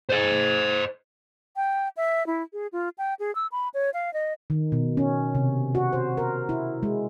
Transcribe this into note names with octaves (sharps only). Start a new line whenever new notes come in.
C5 D#5
G5
E5
E4
G#4
F4
G5
G#4
E6
B5
C#5
F5
D#5
D#3
B2
C#4
C3
F#4
C5
A#4
E4
G#3